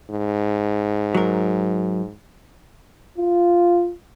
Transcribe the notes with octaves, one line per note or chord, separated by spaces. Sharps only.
G#2
F#3 A#4
F4